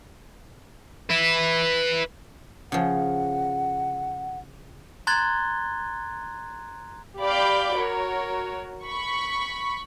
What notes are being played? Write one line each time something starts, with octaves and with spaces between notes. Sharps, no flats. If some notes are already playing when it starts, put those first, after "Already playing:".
B4 E5
C#3 F3 F#5
A#5 C6 F#6 G#6 A6 G7
G4 D5 F5 B5 D6 G6
F#4 A#4 C#5
B5 C#6